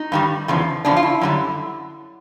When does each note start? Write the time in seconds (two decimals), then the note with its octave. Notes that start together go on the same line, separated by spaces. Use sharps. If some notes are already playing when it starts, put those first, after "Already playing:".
Already playing: D#4
0.12 G2 D#3 G3
0.48 E2 C#3 F3
0.85 E2 C#3 F3 D4
0.97 F4
1.03 E4
1.21 F#2 D3 G3